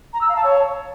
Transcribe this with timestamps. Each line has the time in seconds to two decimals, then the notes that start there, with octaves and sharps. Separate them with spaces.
0.13 A#5
0.21 E6
0.29 F5
0.36 A5
0.44 C#5